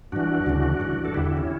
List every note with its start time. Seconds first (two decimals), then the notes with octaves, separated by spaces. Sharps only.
0.12 G2 E3 D4 F#4
0.46 D2 C#3 E3
0.80 G2 E3
1.05 A4
1.14 E2 D3 E4 G4
1.25 E4 G4
1.37 C#4 E4